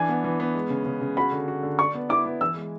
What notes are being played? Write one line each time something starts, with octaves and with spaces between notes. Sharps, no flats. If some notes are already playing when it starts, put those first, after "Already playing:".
Already playing: E3 D4 G#5
B3
E3
B3
G#3
C#3
C#3
C#3
F#4 B5
D3
F#4
D3
D5 C#6
B3
E4 D6
B3
E3 E6
G#3